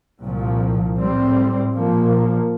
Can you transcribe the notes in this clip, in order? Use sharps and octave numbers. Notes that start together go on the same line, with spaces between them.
C2 A#2 F3
A2 G3 C4
A#2 F3 A#3